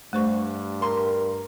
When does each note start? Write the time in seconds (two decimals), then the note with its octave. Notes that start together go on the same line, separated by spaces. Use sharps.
0.13 G2 A3 C5 C#6
0.82 A#4 C6